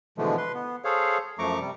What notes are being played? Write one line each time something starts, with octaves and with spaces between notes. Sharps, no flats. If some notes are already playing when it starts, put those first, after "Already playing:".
B2 D3 E3 F3 G#3 A3
B4 C6
B3
G#4 A4 C5 C#5 F5
F#2 F3 A3 A#5 C#6 D6
C3 G3